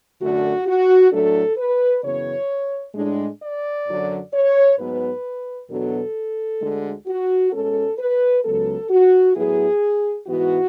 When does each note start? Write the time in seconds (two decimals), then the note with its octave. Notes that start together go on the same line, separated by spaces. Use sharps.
0.20 F#2 D3 A3 D4 F#4
0.65 F#4
1.11 A2 F#3 A3 D4 A4
1.57 B4
2.03 F#2 C#3 E3 B3 C#5
2.94 A2 G#3 D4
3.40 D5
3.86 F#2 D3 F#3
4.32 C#5
4.77 G#2 F#3 B3 B4
5.69 E2 B2 F#3 B3 D4 A4
6.61 D2 D3 G#3
7.06 F#4
7.52 B2 G#3 C#4 A4
7.98 B4
8.44 C#2 C#3 F#3 B3 A4
8.89 F#4
9.35 A2 F#3 B3 E4 G#4
10.27 G#2 E3 B3 E4 F#4